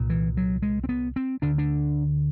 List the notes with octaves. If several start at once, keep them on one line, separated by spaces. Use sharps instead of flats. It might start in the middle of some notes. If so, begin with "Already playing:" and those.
Already playing: C2 A#2
E3
F#3
G#3
C4
B3
C4
D2 D3 D4
D4